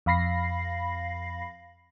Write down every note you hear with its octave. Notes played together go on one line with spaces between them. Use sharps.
F2 F5 B5 A#6 C7